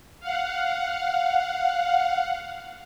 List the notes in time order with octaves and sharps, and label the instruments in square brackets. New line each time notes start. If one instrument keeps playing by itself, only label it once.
[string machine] F5 F#5